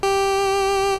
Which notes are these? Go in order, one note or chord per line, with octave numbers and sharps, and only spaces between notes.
G4